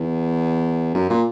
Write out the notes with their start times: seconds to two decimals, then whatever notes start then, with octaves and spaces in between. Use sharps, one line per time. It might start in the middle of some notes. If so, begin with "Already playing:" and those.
Already playing: E2
0.95 F#2
1.10 A#2